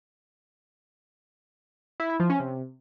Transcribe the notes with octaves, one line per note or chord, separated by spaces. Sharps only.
E4
E4
F3
C#4
C3